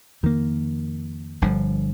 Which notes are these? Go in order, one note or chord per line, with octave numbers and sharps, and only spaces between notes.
F2 D#3 A#3
G1 G2 D3 F3